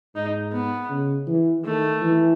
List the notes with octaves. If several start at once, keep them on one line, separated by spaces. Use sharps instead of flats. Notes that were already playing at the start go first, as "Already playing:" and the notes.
G#2 D#4
B3
C#3
E3
D#3 A3
E3